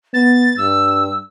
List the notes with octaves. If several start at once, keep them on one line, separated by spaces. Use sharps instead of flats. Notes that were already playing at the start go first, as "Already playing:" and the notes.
B3 A6
G2 E6